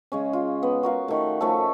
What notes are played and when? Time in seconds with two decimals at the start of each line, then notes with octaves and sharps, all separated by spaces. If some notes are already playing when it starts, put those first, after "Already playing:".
0.12 C#3 G#3 C#4
0.33 F4
0.63 B3
0.83 F#4 A#4 F5
1.08 D#3 A3
1.41 F3 A3 C#4 A4